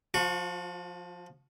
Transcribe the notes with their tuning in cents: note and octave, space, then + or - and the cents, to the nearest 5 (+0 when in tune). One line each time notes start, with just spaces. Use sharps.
F3 +10 F#4 -45 C#6 +0